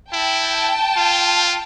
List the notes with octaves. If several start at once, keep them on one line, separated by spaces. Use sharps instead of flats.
E4 G5 A5
F4